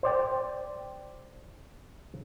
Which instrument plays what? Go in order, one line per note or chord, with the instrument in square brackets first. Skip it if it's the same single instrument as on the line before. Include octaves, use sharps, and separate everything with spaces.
[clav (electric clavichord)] C5 D5 G5